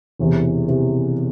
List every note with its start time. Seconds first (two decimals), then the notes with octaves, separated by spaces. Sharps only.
0.19 E1 E2 C3 E3
0.68 C3 E3